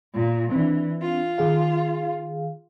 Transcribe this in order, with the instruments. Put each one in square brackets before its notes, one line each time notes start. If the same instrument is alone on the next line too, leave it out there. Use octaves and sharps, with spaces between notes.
[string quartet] A#2
[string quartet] E3 [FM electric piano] C4 D4
[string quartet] F4
[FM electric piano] D#3 G#4 F5